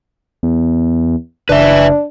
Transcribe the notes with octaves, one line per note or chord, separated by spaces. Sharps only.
E2
F#1 D4 B4 E5